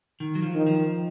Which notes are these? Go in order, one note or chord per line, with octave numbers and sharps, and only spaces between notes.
D#3
F#3
F3
D#3
F3